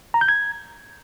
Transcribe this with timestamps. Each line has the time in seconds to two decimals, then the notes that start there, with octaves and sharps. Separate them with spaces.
0.14 A#5
0.21 G6
0.29 G#6